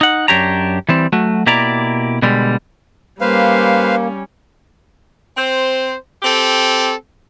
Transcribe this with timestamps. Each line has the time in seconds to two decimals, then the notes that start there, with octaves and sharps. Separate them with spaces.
0.01 D#4 F#5
0.28 F#2 D4 G4 C#5 A#5
0.89 E3 G3 C4
1.13 F#3 A3 F#4
1.46 B2 A#3 E4 G4 D5 A#5
2.22 B2 D3 G3 G#3
3.21 G3 A#3 C#4 B4 C5 F5
5.37 C4 C5
6.23 C4 G4 A4